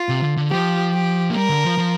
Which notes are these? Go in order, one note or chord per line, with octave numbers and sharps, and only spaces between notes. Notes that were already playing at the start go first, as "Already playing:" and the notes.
Already playing: F4
C3
D3
D3
F3 G4
G4
A#3
G3 A#4
D3
F3
F3